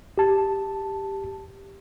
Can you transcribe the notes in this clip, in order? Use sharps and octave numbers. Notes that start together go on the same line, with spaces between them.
G4 A5